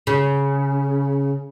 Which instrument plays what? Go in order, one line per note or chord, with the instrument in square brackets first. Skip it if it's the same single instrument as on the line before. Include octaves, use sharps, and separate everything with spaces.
[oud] C#3